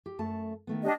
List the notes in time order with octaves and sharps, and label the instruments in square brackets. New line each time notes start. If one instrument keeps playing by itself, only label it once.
[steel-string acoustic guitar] G4
F#2 A3 A5
D#3 A3 B3
[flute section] D4 G4 D#5